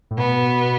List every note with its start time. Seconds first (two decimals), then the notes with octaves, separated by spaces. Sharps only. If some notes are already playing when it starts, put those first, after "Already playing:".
0.11 A2
0.18 B2 B3